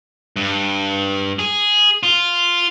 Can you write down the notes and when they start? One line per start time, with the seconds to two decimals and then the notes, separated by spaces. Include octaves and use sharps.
0.36 G2
1.39 G#4
2.03 F4